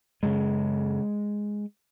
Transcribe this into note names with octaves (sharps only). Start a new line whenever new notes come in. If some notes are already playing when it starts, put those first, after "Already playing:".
F#2 C#3 G#3